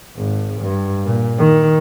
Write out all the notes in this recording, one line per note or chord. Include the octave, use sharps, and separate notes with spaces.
G#1
G2
A#2
D#3